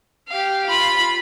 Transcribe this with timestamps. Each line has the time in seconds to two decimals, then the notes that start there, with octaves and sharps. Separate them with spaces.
0.28 G4 F5
0.70 F4 B5